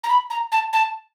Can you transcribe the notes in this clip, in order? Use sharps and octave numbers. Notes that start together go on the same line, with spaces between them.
A#5
B5
A#5
A5
A5